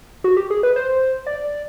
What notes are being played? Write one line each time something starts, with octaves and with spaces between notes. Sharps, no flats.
F#4
G4
G#4
B4
C5
D5